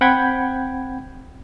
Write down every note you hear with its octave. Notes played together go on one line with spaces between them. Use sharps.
C4 F#5 G5 B5 G6 G#6